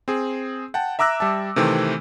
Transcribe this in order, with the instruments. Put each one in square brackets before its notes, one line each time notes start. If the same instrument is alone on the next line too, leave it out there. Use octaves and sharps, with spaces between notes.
[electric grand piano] C4 G#4
F#5 G5 A5
E5 A#5 D6 E6 F#6 A#6
G3 E5 A5
C3 D#3 E3 A3 C4